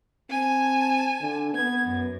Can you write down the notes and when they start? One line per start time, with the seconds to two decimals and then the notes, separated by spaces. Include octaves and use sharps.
0.30 C4 G#5 A5
1.21 D3
1.53 B3 G#6
1.84 F#2